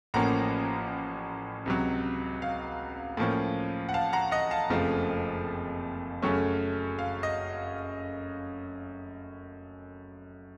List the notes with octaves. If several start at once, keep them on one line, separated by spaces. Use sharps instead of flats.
A1 A2 F3 A#3 C#4 F#5 A#5
C#2 C3 F#3
F5
A2 F3 A#3 C#4
F#5
F5 A5
F#5 A#5
D#5 F#5
F5 A5
F#1 F2 C#3 F3 A3
F#2 C#3 F#3 A3 C#4
F5
D#5